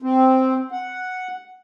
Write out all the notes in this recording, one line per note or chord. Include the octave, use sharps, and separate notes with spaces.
C4
F#5